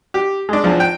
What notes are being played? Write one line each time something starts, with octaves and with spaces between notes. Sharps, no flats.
G4
G#3 D4
E2 F3
G5